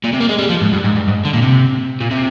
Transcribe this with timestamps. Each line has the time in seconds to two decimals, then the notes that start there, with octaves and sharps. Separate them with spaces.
0.04 A#2
0.13 C3
0.20 A#3
0.29 G#3
0.39 G3
0.49 F3
0.61 G#2
0.73 G2
0.84 G#2
0.96 G2
1.08 G#2
1.25 D3
1.33 A#2
1.42 C3
2.01 A#2
2.11 C3